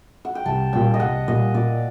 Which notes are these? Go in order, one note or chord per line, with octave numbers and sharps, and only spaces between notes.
F#5
G5
C2 A5
A#2 G3 G5
D#5
C2 F#5
A#2 G3 D#5
A#2 D5